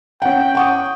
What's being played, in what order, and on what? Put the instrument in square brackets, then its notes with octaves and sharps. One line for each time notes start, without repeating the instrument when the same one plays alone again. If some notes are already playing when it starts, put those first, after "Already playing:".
[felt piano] C#4 F#5 [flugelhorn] G5
[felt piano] F#5 C#6 D#6